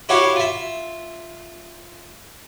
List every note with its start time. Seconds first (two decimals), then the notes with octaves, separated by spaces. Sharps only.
0.09 E4 F#4 G4 C#5 F5 F#5
0.36 F4 E5